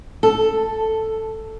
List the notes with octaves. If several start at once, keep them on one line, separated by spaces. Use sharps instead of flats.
A4